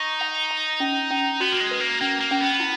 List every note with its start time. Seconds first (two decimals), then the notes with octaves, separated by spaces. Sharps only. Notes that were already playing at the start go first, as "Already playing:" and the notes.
Already playing: D#4 C#6
0.21 F#5
0.51 A#5
0.80 C#4
1.10 C#4
1.40 B3 F#4
1.52 A#3
1.60 G#3
1.71 B4
1.80 A#3
2.01 A#3 C#4
2.21 A#3
2.31 C#4
2.41 B3
2.60 E4